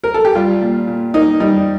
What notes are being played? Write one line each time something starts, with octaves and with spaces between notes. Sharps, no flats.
A#4
A4
G4
G3 F4
A#2
A#2
A#3 D#4
G3 D#4